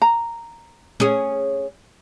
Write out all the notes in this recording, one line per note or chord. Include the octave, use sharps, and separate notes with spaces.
A#5
C#4 G#4